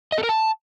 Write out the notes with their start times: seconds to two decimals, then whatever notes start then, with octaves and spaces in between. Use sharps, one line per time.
0.12 D#5
0.18 A4
0.23 A#4
0.29 A5